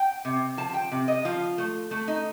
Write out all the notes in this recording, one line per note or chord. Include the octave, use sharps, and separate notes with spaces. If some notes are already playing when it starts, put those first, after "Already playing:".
Already playing: G5
C3
F3 A5
G5
C3
D#5
F3 F4
A3
A3
D#4